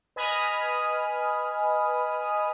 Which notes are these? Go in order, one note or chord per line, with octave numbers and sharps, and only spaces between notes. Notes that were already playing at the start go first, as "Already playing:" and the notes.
B4 D#5 G#5 B5 D#6 F6